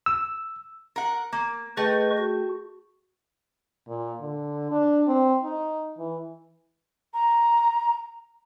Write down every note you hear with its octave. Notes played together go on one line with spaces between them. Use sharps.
E6
A#4 F#5
A#3
A3 G#4 B4 D#5 G5 C#6 G6
F#4
A#2
D3
D4
C4
D#4
E3
A#5